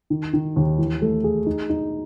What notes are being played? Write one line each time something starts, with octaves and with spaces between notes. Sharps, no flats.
D#3
D#3
D#2
E3
A3
G#4
D#4
D#4